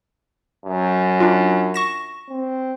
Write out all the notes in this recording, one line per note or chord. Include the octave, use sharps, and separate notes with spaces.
F#2
D4 F4
C#6 A#6 E7
C4